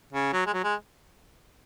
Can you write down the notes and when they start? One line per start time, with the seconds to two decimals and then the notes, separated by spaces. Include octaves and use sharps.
0.13 C#3
0.33 F#3
0.46 G#3
0.53 F#3
0.64 G#3